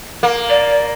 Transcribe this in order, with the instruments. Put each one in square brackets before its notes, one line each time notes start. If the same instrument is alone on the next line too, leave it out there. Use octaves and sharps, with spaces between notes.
[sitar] A#3
[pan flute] D5